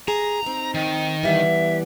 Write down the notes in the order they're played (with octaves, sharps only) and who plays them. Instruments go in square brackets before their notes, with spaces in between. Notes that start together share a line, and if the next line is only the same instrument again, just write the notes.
[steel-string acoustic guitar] G#4 [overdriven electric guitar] A#5
[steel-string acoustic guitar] C4 D#4
[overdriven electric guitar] D#3
[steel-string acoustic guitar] E3 G3 B3 [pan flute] E5